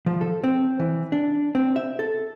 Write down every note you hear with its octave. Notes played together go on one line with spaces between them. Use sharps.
F3
A4
C4
E3
D4
C4
E5
A4